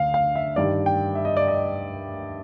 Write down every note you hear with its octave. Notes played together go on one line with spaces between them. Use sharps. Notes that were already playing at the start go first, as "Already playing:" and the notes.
Already playing: D2 D3 F5
F5
E5
G2 D#3 G3 D5
G5
E5
D#5
D5
D#5